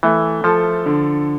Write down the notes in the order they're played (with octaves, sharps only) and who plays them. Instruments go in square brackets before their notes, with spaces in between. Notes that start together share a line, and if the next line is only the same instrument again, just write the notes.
[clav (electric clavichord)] E3 [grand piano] A3
[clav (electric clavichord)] F3 [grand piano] A4
[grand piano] D3